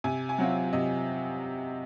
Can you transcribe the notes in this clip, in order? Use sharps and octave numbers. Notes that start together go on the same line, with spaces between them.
C3 G#5
G#5
F#3 C4 F4 F#5
C3 D#5